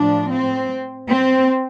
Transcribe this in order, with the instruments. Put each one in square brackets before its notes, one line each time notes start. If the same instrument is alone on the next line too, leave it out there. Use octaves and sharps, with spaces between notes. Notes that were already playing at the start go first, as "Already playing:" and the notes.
Already playing: [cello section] A2 F3 D4
C4
C4